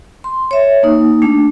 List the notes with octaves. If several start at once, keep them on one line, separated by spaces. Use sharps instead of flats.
C6
C#5 E5
A#3 D#4
A3 D4